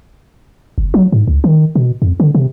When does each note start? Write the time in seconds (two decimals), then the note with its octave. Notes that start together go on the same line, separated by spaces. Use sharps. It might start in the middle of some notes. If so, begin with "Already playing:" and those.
0.78 F#1
0.94 F#3
1.12 G#2
1.28 C#2
1.44 D#3
1.75 B2
2.02 F2
2.20 D3
2.35 C3